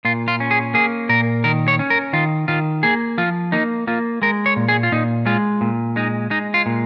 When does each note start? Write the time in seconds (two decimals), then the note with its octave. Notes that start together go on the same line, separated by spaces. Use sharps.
0.05 A#2 F4
0.28 F4
0.40 C#4
0.51 G#4
0.74 A#3 G#4
1.09 A#2 A#4
1.44 D#3 A#4
1.68 C#5
1.79 C#4
1.90 A#4
2.13 D#3 F4
2.48 D#3 F4
2.83 A#3 G#4
3.18 F3 F4
3.52 A#3 D#4
3.87 A#3 F4
4.22 G#3 A#4
4.46 C#5
4.56 A#2
4.68 G#4
4.83 F4
4.92 A#2 D#4
5.26 G#3 F4
5.61 A#2
5.96 G#3 D#4
6.30 G#3 D#4
6.54 F4
6.66 A#2